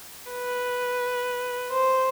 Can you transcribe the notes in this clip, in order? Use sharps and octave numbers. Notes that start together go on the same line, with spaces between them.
B4
C5